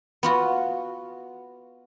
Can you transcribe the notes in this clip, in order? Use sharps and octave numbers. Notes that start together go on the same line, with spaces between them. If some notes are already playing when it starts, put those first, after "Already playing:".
B3 F4 F#4